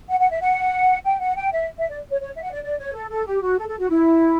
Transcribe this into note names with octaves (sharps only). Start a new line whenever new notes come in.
F#5
F#5
E5
F#5
G5
F#5
G5
E5
E5
D5
C#5
C#5
E5
F#5
D5
D5
C#5
A4
A4
G4
F#4
A4
A4
F#4
E4